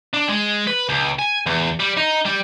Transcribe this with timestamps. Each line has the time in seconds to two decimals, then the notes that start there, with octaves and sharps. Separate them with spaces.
0.14 D4
0.29 G#3
0.67 B4
0.89 C#2
1.19 G#5
1.46 E2
1.80 G3
1.97 D#4
2.26 G3